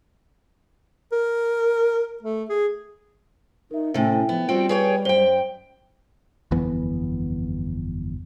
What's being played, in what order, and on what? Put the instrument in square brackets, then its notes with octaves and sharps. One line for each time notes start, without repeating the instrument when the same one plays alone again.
[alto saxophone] A#4
A3
G#4
[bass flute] D#4 [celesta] A#4 E5
[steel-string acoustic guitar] A2 C3 [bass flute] C#4 [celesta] E5 G5
[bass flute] F3 [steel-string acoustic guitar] B3
[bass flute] G3 [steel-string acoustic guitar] C4 F#4 G5 [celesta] F4
[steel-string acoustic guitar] G#4 C#5 G5 [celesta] B4
[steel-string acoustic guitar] F#2 G5 [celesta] C5 G7
[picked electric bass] G1 F2 E3 B3